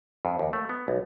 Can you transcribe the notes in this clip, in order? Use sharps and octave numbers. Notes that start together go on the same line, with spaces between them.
F2
D#2
A3
B3
B1